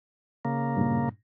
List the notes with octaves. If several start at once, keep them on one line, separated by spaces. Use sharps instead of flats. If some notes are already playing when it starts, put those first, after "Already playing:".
C#3 A#3
G2 A#2